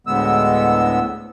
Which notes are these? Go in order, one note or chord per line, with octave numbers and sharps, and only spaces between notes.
D2 A2 D3 G#3 B3 E6